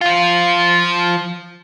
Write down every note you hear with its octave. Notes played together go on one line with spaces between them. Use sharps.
F3 F4